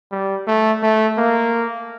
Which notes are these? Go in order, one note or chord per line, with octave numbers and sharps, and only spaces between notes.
G3
A3
A3
A#3